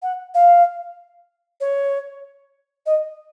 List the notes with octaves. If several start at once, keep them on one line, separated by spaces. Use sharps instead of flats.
F#5
F5
C#5
D#5